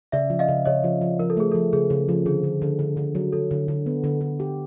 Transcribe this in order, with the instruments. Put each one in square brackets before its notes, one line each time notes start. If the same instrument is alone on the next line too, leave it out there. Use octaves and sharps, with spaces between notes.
[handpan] C#3 [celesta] D5 E5
[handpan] F3
[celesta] D#5 F5
[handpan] C#3
[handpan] C#3 [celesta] C#5 D#5
[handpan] F3
F3
[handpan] F3 [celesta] A#4
[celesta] A4
[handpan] A3 [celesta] G#4
[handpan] F3 [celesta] A4
[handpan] C#3 [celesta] G#4
[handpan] C#3
F3
[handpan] D3 [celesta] G#4
[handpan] D3
D3
D3
D3
F#3
[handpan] D3 [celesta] A4
[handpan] D3
D3
B3
D3
D3
G4